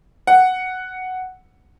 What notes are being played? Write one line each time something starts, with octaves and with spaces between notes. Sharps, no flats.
F#5